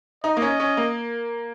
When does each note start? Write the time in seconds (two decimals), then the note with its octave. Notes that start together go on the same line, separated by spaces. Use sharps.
0.24 D#4 D#5
0.37 A#3
0.42 C#4
0.60 C#4
0.77 A#3